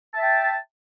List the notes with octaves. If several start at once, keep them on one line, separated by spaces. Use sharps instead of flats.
E5 G5 A5